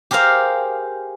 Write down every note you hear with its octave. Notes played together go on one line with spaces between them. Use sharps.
G4 G#4 A#4 C5 F5